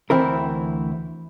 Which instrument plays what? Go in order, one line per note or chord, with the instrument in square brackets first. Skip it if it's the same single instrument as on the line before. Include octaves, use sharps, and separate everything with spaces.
[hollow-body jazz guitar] D2 E3 C4 E4 A#4